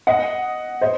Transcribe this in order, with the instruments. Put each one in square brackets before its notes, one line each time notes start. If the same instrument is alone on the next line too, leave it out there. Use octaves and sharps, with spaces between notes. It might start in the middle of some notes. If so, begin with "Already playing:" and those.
[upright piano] D#5 F#5
C5 D#5